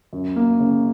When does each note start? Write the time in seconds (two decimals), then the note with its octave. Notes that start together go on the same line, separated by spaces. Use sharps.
0.13 F#2
0.36 A#3
0.60 C#3